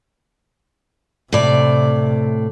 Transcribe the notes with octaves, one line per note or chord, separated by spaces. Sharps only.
A2 C3 D5